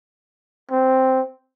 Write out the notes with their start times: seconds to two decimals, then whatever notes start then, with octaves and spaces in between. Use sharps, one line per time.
0.71 C4